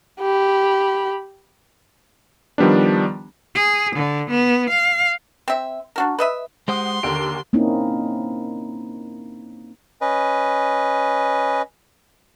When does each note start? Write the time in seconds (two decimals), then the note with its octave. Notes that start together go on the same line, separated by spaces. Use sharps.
0.21 G4 B5
2.58 D#3 F3 G3 B3 D4
3.55 G#4
3.96 D3
4.31 B3
4.71 F5
5.48 C4 E5
5.96 D4 F#4 A#4
6.18 B4 D#5 E5
6.68 G#3 G4 C5 F#5 C6 D#6
7.03 D#2 D3 G4 A#4 D7
7.53 A#3 C4 C#4 D#4 E4
10.01 C#4 B4 D#5